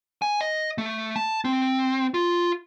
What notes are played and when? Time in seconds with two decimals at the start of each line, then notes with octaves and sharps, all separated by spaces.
0.22 G#5
0.41 D#5
0.78 A3
1.16 A5
1.45 C4
2.14 F4